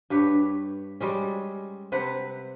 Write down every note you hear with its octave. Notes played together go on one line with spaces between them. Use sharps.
G2 G4 B4 C#5
G3 G#3 C#4
C3 C4 B4 F#5